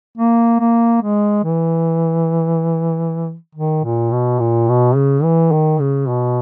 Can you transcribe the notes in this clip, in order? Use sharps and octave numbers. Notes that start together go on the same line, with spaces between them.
A#3
A#3
G#3
E3
D#3
A#2
B2
A#2
B2
C#3
E3
D#3
C#3
B2